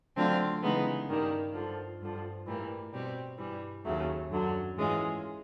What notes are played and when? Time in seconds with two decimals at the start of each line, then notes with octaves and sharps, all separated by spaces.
0.16 D3 F#3 A3 C4 F4
0.62 C#3 E3 G#3 B3 D#4
1.09 G2 D#3 G3 A#3
1.54 G2 D3 F3
2.00 G2 D3 F3
2.46 A2 E3 G3 A#3
2.92 B2 G3 C4
3.38 G2 E3 G3
3.85 D#2 C#3 F#3 A3
4.30 F#2 D3 F#3
4.76 G#2 E3 G#3 C#4 F4